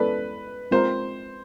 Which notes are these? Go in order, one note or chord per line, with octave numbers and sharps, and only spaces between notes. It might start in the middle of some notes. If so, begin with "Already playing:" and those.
Already playing: G#3 B3 E4 A4 B4 D5
G#3 C4 F4 A#4 C5